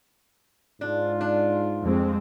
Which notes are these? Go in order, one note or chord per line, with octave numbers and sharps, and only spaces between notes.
G#2 D4 F4
D4
F2 G#3 C4